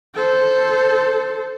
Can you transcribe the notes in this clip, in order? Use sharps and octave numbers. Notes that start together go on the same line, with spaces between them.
A4 C5